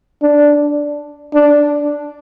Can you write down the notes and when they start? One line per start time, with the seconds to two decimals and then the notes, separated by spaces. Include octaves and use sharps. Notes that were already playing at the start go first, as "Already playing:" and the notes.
0.22 D4
1.34 D4